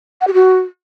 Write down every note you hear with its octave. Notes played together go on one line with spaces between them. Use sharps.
F#5
G4
F#4